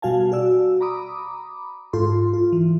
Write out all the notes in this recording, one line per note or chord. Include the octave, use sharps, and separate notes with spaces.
B2 G3 F#4 F5 G#5 A5
F#4 D5 E6
A#5 B5 D6 D#6
G#2 F4 A4 C6
F4
E3